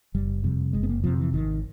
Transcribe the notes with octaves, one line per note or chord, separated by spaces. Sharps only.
F#1 G3
F2 C3 G3
F#1 G#3
B3
A#3
F2 C3 F3
E3
G#1 D#3